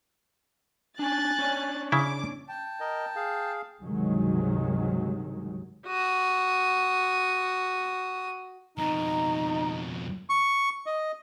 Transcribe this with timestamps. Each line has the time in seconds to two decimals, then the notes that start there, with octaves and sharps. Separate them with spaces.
0.99 C#4 D4 G#5 F#6 A6
1.39 C#4 D4 C#5
1.92 C#3 E4 D6
2.48 G5 A5
2.80 A#4 D#5
3.16 G#4 F5
3.82 C#2 G2 C3 D#3 F#3 G#3
5.86 F#4 D#6
8.78 F2 B2 D#4 A#5
10.29 C#6
10.86 D#5